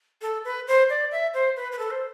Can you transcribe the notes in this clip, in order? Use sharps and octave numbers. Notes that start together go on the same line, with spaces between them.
A4
B4
C5
D5
E5
C5
B4
B4
A4
C5